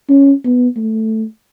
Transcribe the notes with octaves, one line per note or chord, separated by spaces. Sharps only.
C#4
B3
A3